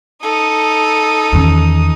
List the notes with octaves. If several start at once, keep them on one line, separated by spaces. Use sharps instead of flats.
D#4 A4 D#6
E2 D#3 C#4